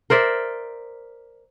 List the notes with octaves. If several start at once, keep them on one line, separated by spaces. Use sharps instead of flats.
A#4 C5 D5 E5